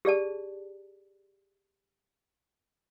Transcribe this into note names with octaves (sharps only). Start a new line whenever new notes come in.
G4 G#4 D5 A5